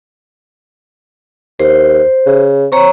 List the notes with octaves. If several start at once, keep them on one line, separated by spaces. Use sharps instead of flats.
D#2 C5
C#3
C4 C#5 A#5 C#6